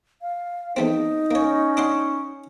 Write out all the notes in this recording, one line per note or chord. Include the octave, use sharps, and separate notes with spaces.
F5
E2 A3 C4 D#4
A#3 C#4 C#5
D4 F#5 C6